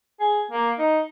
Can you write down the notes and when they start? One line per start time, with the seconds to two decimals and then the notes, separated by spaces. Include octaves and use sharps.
0.20 G#4
0.51 A#3
0.79 D#4